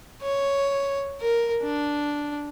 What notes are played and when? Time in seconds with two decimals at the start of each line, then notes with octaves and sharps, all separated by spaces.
0.22 C#5
1.21 A#4
1.63 D4